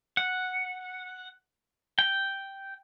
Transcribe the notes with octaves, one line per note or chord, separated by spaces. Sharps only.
F#5
G5